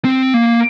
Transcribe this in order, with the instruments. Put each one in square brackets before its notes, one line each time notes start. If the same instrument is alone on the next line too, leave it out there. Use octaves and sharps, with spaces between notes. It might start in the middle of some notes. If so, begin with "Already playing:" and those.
[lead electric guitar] C4
A#3